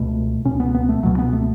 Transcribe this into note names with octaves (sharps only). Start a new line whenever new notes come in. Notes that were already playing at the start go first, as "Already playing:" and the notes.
Already playing: C#2 B2 A3
C#2 B2 C#4
B3
B3
A3
C#2 B2 F#3
B3
A3